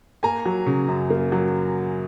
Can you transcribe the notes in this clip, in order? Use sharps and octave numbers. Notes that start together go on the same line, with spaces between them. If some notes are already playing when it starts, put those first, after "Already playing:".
A#3 G#5 A#5
F#3
C#3
F#2
A#3
F#3